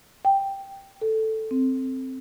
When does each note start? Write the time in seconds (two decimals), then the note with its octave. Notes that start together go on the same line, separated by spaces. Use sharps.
0.25 G5
1.01 A4
1.51 C4